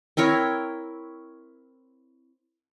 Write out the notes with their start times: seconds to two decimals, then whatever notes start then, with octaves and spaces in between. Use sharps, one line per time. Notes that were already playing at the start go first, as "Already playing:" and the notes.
0.17 C4 E4 A#4 C#5